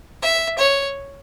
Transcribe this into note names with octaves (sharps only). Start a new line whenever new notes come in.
E5
C#5